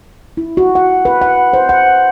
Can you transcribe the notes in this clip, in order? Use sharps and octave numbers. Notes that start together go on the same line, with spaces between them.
E4
F#4
F#5
B4
F#5
C5
F#5